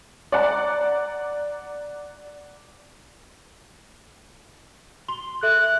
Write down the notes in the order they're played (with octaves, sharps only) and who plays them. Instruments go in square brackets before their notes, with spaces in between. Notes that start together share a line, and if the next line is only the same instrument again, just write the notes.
[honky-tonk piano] D5 F#5 A#5
[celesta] C6 G7
[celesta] A4 E5 [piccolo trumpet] F#6